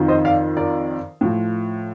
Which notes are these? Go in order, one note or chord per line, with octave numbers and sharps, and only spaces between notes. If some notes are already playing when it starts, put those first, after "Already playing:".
Already playing: F2 D#3
C5 D#5
D5 F5
A#4 D5
A2 F3